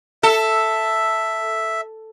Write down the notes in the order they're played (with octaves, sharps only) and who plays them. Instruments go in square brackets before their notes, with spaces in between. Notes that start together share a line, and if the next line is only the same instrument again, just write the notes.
[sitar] A4 [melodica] E5